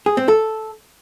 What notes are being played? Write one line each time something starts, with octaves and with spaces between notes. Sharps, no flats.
G#4
C4
A4